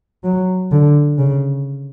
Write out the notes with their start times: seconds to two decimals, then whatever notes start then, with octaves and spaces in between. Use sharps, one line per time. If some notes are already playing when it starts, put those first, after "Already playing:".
0.24 F#3
0.72 D3
1.19 C#3